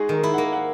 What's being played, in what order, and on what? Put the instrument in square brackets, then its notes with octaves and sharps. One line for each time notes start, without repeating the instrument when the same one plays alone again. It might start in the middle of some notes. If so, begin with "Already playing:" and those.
Already playing: [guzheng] G#3 D#4 F#4 [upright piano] G#4
[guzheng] D#3 [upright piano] A#4
[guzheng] E4
[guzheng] A#3 [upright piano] F#5
[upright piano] F#5